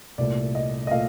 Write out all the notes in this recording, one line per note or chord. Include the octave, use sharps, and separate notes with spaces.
C2 A#2 A3 D5
D#5
D#5
A#2 A3 F5